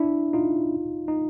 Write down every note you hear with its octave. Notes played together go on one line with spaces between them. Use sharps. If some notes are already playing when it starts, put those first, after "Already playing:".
Already playing: D4 E4
D#4 F4
D#4